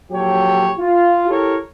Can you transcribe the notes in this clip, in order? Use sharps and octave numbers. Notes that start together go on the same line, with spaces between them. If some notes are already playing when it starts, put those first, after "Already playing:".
A#1 F#3 G4 A4 C#5 G5
F4
E4 G4 A4 A#4 C#5